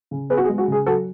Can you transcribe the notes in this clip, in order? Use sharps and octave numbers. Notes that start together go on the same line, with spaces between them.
C#3
B3 G#4 B4
F#4
G#4
G#3
F#4
C#3 G#4
F#3 F#4 A4